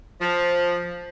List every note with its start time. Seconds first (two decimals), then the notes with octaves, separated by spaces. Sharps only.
0.20 F3